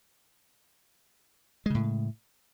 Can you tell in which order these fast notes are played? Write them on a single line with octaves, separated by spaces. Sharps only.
G#3 C#3 A2